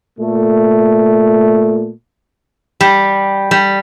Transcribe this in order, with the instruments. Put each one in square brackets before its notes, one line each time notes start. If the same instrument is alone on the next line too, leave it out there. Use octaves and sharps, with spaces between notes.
[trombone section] A#2 A3
[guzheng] G3
G3